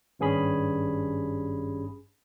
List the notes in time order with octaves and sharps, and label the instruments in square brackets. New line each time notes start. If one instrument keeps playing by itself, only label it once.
[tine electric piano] G#1 G2 C#4 G#4 B5